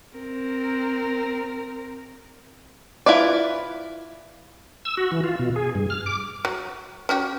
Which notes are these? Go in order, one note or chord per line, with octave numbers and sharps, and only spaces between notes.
C4 A#4
E4 F4 B4 D5
E6
F#4
E3
F4
B2
G#4
G2
F6
D6
F#3
C#4 F#4 G4